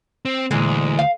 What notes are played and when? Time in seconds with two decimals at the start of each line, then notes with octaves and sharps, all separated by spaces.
0.25 C4
0.51 D2 A#2 E3 G#3
0.99 F5